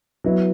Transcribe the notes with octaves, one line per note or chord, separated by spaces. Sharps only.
F#3 B3 E4